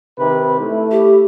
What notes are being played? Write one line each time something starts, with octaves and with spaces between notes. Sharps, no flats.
C3 D#3 B4
A3 E4
G4